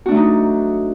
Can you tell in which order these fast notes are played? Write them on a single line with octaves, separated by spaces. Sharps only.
F#4 D4 A3 F#3 D#4